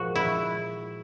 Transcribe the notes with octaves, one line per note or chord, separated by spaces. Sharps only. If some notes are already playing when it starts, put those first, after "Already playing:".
Already playing: A#2 F3 G#3 F#4
E4